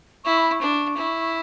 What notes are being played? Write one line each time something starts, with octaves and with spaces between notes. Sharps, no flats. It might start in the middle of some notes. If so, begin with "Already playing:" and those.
E4 C#6
B5
C#6
D4
E4